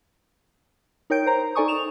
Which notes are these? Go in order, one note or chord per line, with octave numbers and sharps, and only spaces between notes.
D#4 A#4 C#5 G5 G6 D7
C5 A#5
D#4 A4 D5 G#5 C#6 D#6
E7 F7